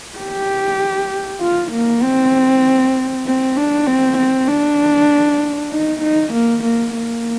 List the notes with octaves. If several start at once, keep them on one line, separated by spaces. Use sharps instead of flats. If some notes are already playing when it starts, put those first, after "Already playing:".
G4
F4
A#3
C4
C4
D4
C4
C4
D4
D#4
D#4
A#3
A#3
A#3